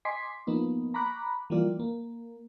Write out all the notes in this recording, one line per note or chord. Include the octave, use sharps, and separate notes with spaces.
D#5 G#5 C6 D6 B6 C7
F3 A#3 B3 D#4
A#5 B5 C#6 D6 F#6
E3 F3 G3 A#3 F4 D5
A#3